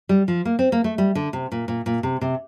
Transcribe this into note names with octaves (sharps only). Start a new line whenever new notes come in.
G3
F3
A#3
C4
A#3
A3
G3
D3
C3
A#2
A#2
A#2
C3
C3